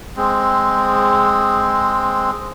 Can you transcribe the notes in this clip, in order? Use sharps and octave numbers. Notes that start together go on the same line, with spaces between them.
G#3 C4